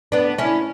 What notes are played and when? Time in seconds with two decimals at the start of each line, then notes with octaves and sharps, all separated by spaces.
0.12 B3 D4
0.38 C#4 E4